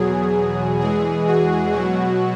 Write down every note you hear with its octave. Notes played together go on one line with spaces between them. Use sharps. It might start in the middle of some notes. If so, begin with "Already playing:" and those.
Already playing: E2 B2 F#3 G#4
E2 E3 G#3 G#4
F#4
B2 F#3 F#4